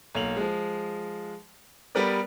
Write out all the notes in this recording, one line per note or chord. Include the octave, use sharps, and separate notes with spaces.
B1 A#3 F7 F#7
F3 G#3
G3 B3 G4 A#4 B4 D5